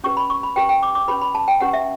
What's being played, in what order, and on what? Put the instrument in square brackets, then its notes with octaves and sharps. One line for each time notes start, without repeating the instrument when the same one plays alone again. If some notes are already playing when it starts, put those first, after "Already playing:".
[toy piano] C#4 G4 B4 C#6
B5
C#6
B5
C#4 G4 B4 G5
G5
D6
D6
C#4 G4 B4 B5
B5
A5
G5
C#4 G4 B4 F#5
E5